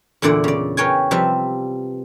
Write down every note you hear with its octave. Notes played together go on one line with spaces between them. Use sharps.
E2 A#2 D3 E4 D5
C#3 D5
A#4 B4 C#5 G5 G#5
C3 F3 G3 B4 E5